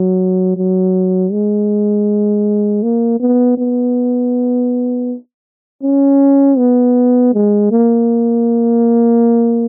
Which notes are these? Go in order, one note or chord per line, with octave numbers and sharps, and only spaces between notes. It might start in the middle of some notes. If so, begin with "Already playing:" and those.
Already playing: F#3
F#3
G#3
A#3
B3
B3
C#4
B3
G#3
A#3